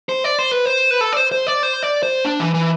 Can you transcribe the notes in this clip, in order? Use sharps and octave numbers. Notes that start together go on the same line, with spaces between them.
C5
D5
C5
B4
C5
B4
A4
D5
C5
C5
D5
C5
D5
C5
D4
E3
E3